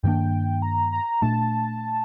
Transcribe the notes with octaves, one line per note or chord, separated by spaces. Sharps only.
G2 D#3 A#3 D4 G5
A#5
A#5
A#2 A3 D4 A5